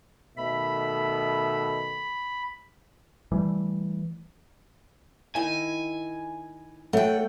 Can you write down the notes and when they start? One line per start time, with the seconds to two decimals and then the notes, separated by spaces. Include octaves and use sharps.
0.37 B2 D#3 A3 E5 B5
3.32 E3 G3 A3
5.36 D#3 E4 G#5
6.93 A3 A4 C#5 F#5 G5